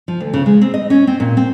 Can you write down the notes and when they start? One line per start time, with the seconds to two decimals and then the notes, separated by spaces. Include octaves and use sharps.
0.08 F3
0.20 D2
0.33 C#3
0.46 G#3
0.61 C4
0.74 D#5
0.90 C#4
1.07 C4
1.20 A#2
1.37 C4